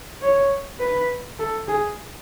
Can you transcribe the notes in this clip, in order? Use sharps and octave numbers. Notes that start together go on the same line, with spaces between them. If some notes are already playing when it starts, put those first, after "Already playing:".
C#5
B4
A4
G#4